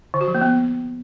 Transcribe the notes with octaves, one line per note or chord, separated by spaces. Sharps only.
D3
F#4
F3
A#3
B3